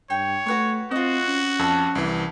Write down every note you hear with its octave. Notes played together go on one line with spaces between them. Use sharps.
G2 C#5 G5
A3 F#4 B4 C#6
C4 F4 F#4 D#5
C#4
F2 A4 F5
C2 E3